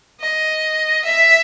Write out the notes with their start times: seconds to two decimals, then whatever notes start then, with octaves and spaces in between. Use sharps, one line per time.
0.21 D#5
1.05 E5